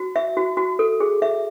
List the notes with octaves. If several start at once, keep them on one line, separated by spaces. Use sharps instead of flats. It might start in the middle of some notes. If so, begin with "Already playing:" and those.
Already playing: F#4
E5
F#4
F#4
A4
G#4
E5